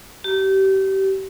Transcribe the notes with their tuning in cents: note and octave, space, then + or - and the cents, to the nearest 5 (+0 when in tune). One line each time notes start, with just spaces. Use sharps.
G4 -30